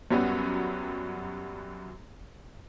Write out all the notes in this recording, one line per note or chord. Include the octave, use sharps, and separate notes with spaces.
F#2 F#3 G3 B3 F#4